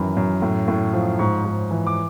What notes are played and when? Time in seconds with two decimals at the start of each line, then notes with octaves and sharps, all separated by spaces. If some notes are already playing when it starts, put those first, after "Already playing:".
Already playing: F#2 D#3 E3 B5
0.17 F#2
0.42 A2
0.68 A2
0.93 F3
1.19 G#2 C#6
1.45 G#2
1.71 E3
1.87 D6